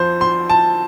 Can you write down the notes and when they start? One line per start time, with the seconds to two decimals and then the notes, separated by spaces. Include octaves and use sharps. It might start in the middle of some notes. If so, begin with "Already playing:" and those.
Already playing: F2 F3 C5
0.21 C6
0.50 A5